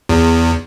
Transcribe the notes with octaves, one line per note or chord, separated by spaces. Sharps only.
E2